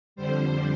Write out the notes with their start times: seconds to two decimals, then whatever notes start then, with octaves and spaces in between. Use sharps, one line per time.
0.16 F2 D3 G3 C5